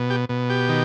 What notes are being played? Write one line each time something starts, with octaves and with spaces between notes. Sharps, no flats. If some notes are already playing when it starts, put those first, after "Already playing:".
Already playing: B2
G4
B2
G4
D#3